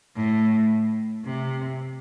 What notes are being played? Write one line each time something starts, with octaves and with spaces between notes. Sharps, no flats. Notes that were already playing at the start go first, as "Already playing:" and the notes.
A2
C3